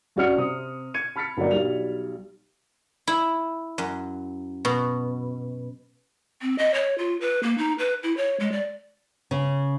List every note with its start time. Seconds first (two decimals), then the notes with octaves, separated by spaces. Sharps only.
0.16 G2 C#4 F#4 D5 F6 C#7
0.37 C3 C4 D#6
0.94 G#6 C#7 D#7
1.16 A5 B5 F6 A6 B6 C#7
1.37 G1 F#3 A#3 D4 A#4 D5
1.51 B1 G3 F7
3.07 E4
3.78 F#2
4.65 B2
6.42 C4
6.58 D#5
6.74 C#5
6.98 F4
7.21 B4
7.43 A#3
7.58 D#4
7.79 B4
8.03 E4
8.17 C#5
8.40 G#3
8.52 D5
9.31 C#3